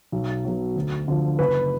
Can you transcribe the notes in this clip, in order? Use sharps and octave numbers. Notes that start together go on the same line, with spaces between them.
B1
B2 F#3
D2
D3 F3
F#1 B4